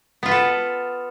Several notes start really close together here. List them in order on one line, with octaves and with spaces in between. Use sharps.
B3 F4 B4 A4